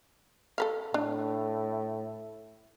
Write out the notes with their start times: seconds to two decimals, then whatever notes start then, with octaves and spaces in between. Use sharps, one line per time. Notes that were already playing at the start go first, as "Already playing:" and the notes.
0.58 A4 B4 F5
0.94 A2 D4